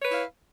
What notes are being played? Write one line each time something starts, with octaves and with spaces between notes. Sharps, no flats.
E4 B4 C#5 F5